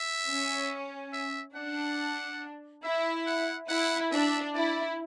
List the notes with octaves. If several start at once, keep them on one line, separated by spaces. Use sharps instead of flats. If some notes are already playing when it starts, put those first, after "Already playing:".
Already playing: E5
C#4
E5
D4 F#5
E4 E5
F#5
E4 F#5
D4 E5
E4 D5